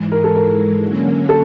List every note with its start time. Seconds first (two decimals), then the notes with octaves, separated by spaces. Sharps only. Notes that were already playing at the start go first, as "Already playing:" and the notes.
Already playing: G#2 E3 G#3
0.12 A#4
0.24 A4
0.35 A#4
0.82 D3 F#3 A#3 C#4
1.29 A4